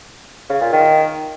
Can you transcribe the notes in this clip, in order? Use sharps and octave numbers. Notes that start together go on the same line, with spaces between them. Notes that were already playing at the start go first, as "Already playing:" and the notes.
C#3
A#2
D#3